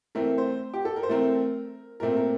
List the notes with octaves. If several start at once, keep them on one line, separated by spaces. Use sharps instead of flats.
E3 A3 C4 A#4
C5
G4
A4
A#4
C5
E3 A3 C4 A#4
A#2 A3 C4 A#4
A#4